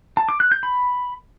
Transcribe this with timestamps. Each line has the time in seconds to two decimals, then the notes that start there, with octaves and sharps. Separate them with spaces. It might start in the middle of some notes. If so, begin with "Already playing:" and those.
0.17 A5
0.29 D6
0.40 F#6
0.52 G6
0.63 B5